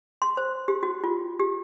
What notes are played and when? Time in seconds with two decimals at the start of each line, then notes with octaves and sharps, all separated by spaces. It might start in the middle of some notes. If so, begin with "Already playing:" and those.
0.22 C6
0.37 C5
0.68 G4
0.83 F#4
1.04 F4
1.40 G4